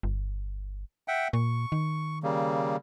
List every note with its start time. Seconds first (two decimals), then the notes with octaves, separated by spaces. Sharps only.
0.03 G1
1.08 E5 F#5 G5
1.33 A#2 C#6
1.72 D#3
2.23 C#3 G3 A#3